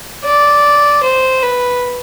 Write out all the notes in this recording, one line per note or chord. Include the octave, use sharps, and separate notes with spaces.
D5
C5
B4